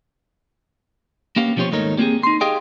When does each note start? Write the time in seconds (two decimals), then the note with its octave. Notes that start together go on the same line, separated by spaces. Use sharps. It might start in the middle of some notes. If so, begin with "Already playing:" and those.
1.36 A#3 B3 C#4 G4 F5
1.56 B2 F3 C#4 G4 C5 C#5
1.71 D#2 G#2 A3 D#4 A#4 C#5
1.97 G3 A#3 C4 F4 G4 G#4
2.23 D#4 C6
2.41 G4 G#4 D#5 F5 G5